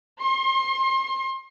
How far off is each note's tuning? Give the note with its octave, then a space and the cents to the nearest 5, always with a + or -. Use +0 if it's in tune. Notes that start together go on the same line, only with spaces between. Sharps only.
C6 +30